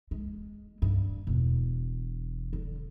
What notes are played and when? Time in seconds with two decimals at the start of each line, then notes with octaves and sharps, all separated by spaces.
0.11 G#3
0.82 G2
1.27 E1
2.53 D3